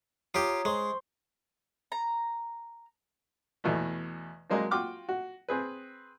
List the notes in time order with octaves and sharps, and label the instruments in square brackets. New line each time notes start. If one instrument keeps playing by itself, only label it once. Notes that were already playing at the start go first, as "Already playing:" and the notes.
[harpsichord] F4 G4 [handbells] C#5 A#5 D#6
[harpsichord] G#3 [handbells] C5 C6 C#6
[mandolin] A#5
[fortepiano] E2 B2 A3
F#3 G#3 A#3 C4 D4
F4 F#4 G5 C6 D6 F6
F#4
C4 G#4 B4